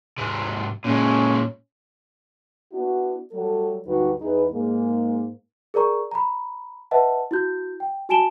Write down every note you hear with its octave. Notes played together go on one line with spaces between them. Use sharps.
G#2 C3
A#2 G#3 C#4
B3 D4 E4 F#4
F#3 G3 A3 A4
D2 G2 F#3 D#4 F#4 B4
E2 D#4 E4 G#4 B4
G#2 G#3 A#3
G#4 A#4 D5 A#5 C#6
A#5 B5
B4 D#5 E5 F#5 A5
E4 F#4 G6
G5
F#4 G#5 A5 D7 E7 G7